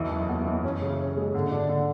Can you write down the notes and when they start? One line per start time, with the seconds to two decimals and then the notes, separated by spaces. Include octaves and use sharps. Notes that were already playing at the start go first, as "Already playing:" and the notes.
Already playing: B1 E2 E3
0.11 F#1
0.29 B3
0.45 E3
0.63 F#2 C#4
0.82 C#3
0.99 C#4
1.17 G#3
1.34 G#2 D3
1.52 G#2 D4
1.69 D3